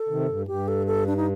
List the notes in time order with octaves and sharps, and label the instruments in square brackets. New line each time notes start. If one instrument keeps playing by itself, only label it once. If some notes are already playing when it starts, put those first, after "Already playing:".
Already playing: [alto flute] A4
[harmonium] C3 D#3
G2
A2
[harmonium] G2 [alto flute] G4
[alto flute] A4
A4
D4
D#4